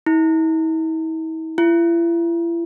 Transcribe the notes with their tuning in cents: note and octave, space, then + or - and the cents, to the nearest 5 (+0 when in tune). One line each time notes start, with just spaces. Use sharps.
E4 -45
E4 +40